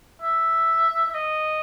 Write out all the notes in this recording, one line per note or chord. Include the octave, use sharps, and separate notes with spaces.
E5
E5
D#5